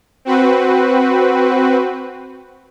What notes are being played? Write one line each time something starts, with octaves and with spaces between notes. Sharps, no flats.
C4 F#4 B4